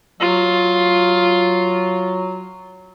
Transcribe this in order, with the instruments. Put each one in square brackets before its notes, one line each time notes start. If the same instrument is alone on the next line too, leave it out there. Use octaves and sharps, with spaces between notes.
[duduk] F#3 [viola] F4